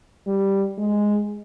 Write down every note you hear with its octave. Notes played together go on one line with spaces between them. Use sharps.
G3
G#3